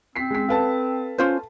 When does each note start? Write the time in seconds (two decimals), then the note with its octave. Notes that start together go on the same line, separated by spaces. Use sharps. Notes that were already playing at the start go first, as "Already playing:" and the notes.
0.16 C4 B6 C7
0.30 G#3 B6
0.49 A4 B4 F5 A5
1.18 C#4 F4 C5